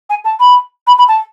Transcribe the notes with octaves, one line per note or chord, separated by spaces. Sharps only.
G#5
A5
B5
B5
B5
A5